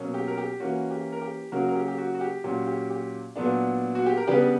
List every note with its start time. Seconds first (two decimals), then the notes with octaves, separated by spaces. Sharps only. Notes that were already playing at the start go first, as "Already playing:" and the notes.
Already playing: B2 F#3 A#3 C#4
0.14 G4
0.28 A#4
0.37 G4
0.60 E3 A#3 C#4 F#4
0.91 G4
1.12 A#4
1.21 G4
1.52 C#3 F#3 A#3 C#4 F#4 A#4
1.69 A#4
1.75 G4
1.88 G4
1.98 F#4
2.15 F#4
2.21 G4
2.44 A#2 F#3 C#4 G4
2.67 G4
2.90 G4
3.36 A#2 F#3 B3 D4
3.95 F#4
4.06 G4
4.17 A#4
4.27 C#3 G3 B3 D4 G4 B4